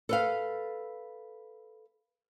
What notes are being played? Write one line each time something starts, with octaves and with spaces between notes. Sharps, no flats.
A4 B4 F5